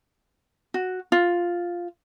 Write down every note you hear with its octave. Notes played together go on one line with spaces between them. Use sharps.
F#4
F4